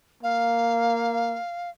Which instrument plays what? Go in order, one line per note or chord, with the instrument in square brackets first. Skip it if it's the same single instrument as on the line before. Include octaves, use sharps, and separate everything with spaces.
[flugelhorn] A#3 [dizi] F5